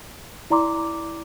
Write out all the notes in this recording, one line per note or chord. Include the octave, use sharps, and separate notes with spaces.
E4 D5 A#5 C6 D6